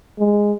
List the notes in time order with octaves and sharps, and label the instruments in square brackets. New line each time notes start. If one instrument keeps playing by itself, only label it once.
[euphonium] G#3